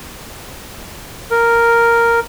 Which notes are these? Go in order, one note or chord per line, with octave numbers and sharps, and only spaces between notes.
A#4